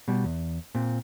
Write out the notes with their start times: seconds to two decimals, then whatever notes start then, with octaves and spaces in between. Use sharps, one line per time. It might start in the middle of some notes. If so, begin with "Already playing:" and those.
0.08 B2 G3
0.24 E2
0.75 A#2 C4